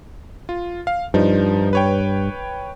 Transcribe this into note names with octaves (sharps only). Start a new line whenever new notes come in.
F4
F5
G2 F3 D#4
B4 C#5 G5